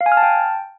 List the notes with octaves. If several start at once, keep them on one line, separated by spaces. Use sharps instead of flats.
F5
G#5
F6
A5
G5